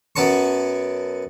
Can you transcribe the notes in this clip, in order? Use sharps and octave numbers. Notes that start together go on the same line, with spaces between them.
F#2 B3 C#4 A5 C#6